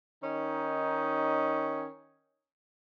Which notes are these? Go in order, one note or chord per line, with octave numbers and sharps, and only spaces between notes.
D#3 C#4 D#4